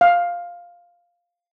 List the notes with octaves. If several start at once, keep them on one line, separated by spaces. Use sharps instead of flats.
F5